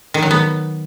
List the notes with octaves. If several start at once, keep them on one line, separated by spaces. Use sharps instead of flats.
D#3
F#3
B3